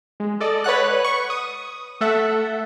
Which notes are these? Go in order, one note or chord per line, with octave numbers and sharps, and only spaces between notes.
G#3
A4 D5 D#5
B4 C#5 F#5 F#6
C#6
D#6
A3 A4 E5 F#5